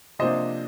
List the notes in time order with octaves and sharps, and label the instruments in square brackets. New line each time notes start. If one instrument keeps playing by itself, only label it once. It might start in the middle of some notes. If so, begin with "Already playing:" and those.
[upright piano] C3 F3 A#3 D4 C5 D#5